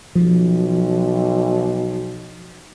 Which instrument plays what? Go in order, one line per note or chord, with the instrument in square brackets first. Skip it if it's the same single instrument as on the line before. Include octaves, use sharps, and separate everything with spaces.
[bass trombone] B1 [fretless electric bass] F3